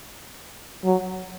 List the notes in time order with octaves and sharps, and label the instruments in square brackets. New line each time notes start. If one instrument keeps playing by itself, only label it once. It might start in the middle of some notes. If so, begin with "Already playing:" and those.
[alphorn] F#3